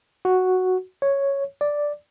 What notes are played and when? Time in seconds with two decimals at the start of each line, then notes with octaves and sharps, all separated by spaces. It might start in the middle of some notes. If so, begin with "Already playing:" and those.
0.25 F#4
1.02 C#5
1.61 D5